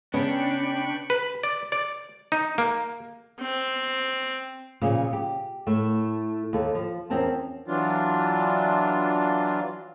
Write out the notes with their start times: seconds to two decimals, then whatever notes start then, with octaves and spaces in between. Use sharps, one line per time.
0.14 C#3 B3 C#4 D4 G5 B5 C#6
1.10 B4
1.43 D5
1.72 D5
2.32 D#4
2.58 A#3
3.40 C4
4.81 A#2 C#3 F3
5.13 G4
5.67 A2 A3
6.53 D#2 A4
6.75 F3
7.10 E2 C4 C#4 A#4 A5
7.68 E3 F#3 D4 F4